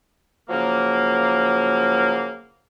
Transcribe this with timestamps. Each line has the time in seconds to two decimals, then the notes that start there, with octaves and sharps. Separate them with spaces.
0.50 C#3 F3 F#3 A#3